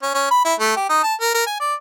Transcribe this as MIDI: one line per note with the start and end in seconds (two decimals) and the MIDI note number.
0.03 0.11 61
0.14 0.26 61
0.31 0.44 83
0.45 0.54 64
0.60 0.73 57
0.76 0.85 67
0.89 1.02 63
1.03 1.15 81
1.21 1.32 70
1.34 1.46 70
1.46 1.57 80
1.60 1.74 74